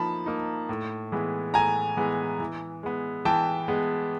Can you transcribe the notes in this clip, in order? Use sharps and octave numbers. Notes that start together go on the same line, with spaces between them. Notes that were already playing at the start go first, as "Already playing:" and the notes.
Already playing: F3 A#3 D#4 A5 B5
A#3 D#4
A2
E3 G#3 B3
A2 G#5 A#5
E3 G#3 B3
E3
G#3 B3
E3 G5 A5
G#3 B3